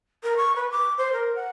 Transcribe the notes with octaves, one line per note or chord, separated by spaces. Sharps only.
A#4
C#6
B4
D6
C5
A#4
F#5